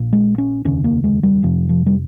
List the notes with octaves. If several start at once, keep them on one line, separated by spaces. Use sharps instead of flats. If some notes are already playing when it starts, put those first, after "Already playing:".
Already playing: A#1 A#2
G#3
C#4
F1 D#2 C#3 C#4
A#3
G#3
G3
F1 F2 C3 F3
F3
G3